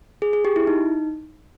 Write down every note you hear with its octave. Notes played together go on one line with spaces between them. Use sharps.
G#4
G#4
G4
E4
D#4